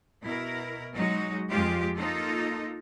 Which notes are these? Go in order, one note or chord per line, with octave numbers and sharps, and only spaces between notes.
B2 E4 A#4
F#3 G#3 D#4 F#4
F2 G#3 F4 G4
A#3 D#4 F4 A4